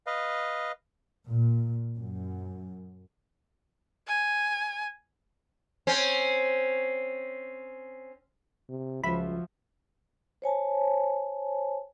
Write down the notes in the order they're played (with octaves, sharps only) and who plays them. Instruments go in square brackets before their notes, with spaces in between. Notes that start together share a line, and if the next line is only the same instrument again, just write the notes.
[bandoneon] B4 D#5 F5
[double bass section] A#2
F#2
[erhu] G#5
[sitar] C4 C#4
[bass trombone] C3
[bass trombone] C#2 [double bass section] F3 [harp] F4 F#4 E5 [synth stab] B5
[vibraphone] C5 C#5 G#5 A5